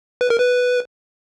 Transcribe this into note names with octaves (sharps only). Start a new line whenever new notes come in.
B4
A#4
B4